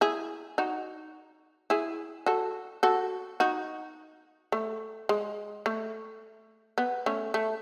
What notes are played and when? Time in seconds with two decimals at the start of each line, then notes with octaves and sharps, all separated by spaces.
0.01 E4 G#4
0.58 D#4 F#4
1.70 E4 G#4
2.26 F#4 A4
2.83 F#4 A4
3.40 D#4 F#4
4.52 A3
5.09 G#3
5.66 A3
6.78 B3
7.06 A3 C#4
7.34 A3